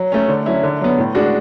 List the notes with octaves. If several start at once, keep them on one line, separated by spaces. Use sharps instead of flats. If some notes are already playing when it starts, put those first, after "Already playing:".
Already playing: F#3
A3 C#4
D3
F#3 C#4 E4
D3
F#3 B3
A2
G#3 D4 F#4